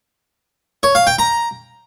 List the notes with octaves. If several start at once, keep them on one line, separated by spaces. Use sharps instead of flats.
C#5
F5
G5
A#5